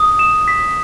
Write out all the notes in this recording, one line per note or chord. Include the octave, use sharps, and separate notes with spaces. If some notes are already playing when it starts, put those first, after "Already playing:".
Already playing: D#6
E7
B6